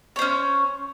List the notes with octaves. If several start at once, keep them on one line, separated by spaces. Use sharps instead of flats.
C#4 C5 C#5